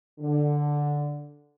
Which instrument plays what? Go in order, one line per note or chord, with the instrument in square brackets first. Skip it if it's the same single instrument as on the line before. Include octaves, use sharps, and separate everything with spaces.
[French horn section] D3